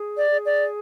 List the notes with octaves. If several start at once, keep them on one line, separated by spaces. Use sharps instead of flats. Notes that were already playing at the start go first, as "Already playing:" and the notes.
Already playing: G#4
D5
G#4
D5